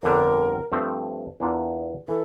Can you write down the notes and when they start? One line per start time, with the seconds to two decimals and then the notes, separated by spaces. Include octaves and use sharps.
0.03 G1 F2 D3 G3 D4 A#4
0.72 G2 F3 A3 C4
1.40 E2 E3 A#3 D4 F4
2.08 E3 A4